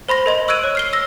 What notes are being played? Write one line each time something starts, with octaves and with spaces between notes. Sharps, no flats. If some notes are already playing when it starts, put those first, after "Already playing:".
C5 B5 C6 A#6
A#4 D#5 C6
C#6 E6 F#6 G#6 D7 D#7
C#5
F6 C7 G7
E6 A#6